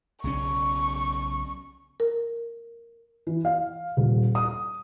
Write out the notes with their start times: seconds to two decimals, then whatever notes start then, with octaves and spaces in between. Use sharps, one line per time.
0.24 B1 C#3 C#4 C#6
2.00 A#4
3.27 E3
3.45 F5
3.97 D#1
4.35 D#6